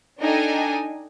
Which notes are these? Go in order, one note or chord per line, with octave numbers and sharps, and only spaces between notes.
D4 D#4 A4 D#5 G5 G#5